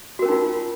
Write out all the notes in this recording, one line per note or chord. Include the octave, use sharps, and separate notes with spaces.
C#4 D#4 F4 F#4 A#4